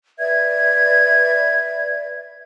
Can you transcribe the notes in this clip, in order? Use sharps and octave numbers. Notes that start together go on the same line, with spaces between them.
B4 D5 E5 G#6